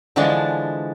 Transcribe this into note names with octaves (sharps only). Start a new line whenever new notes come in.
D3 E3 F3 G#3 D4